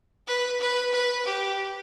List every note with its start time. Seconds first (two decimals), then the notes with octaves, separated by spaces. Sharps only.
0.28 B4
0.60 B4
0.93 B4
1.26 G4